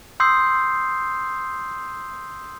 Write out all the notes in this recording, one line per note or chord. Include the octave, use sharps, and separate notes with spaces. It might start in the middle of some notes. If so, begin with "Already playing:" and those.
C6 D#6 E6 G6 C7